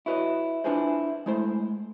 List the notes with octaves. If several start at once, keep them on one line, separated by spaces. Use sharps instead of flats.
E4 F#4 B4 C#5 D#5
D4 E4 F4 G#4 B4 C5
G#3 A3 E4 C5